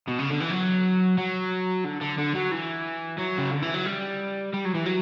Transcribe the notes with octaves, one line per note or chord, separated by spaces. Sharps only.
B2
C#3
D3
E3
F#3
F#3
D3
D3
D3
F#3
E3
F#3
C#3
D3
E3
F#3
G3
G3
F#3
E3
F#3